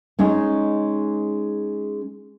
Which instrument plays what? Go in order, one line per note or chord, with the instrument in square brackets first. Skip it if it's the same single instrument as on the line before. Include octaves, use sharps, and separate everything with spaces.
[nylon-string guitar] G#3 C#4 D#4